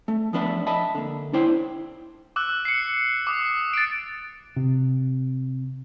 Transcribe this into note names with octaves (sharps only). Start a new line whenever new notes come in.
A3
F3 B3 D4 B4 D5 E5
D#5 E5 A5 B5
D3 A#3
D4 E4 C5 G5
D6 E6 F#6
C7 C#7
D6 D#6
A6 D7
C3